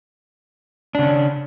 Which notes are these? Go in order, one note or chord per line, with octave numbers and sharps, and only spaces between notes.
C#3 C#4 D4